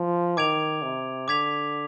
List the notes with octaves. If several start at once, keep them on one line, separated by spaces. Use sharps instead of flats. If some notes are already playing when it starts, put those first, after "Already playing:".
Already playing: F3
D#3 D6 G#6 D7 F7
C3
D3 D6 G#6 B6 F7